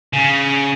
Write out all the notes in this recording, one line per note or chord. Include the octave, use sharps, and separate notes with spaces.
C#3